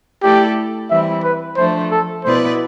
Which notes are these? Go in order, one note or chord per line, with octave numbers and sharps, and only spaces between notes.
A3 E4 G4 A4 D5
E3 G3 C4 E4 E5
B4
F3 A3 D4 C5
A4
B2 B3 E4 B4 C5 D5